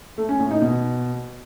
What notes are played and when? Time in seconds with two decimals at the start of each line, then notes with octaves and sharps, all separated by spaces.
0.18 A3
0.29 C#4
0.40 A2
0.51 D#4
0.62 B2